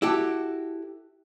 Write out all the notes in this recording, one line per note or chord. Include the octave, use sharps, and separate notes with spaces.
E4 F#4 G4 A4